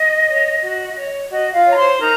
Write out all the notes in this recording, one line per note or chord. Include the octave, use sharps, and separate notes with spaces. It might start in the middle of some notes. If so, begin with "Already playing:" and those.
Already playing: D#5
C#5
F#4
C#5
F#4 D#5
F4 F5
C#5
A#5
C5 C6
D#4 A#4 A#5